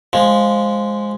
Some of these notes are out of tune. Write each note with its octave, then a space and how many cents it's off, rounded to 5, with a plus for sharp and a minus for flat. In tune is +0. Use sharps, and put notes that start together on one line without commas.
F3 +5 G#3 +0